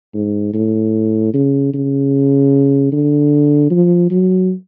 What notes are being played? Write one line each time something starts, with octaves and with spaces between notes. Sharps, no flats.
G#2
A2
C#3
C#3
D3
F3
F#3